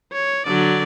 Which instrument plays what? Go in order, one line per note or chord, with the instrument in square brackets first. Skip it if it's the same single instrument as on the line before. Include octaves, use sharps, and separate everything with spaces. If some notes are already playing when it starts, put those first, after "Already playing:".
[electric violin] C#5
[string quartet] D3 F#3 [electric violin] D5